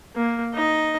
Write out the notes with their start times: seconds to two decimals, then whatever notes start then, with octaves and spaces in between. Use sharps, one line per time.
0.16 A#3
0.54 D#4 D#5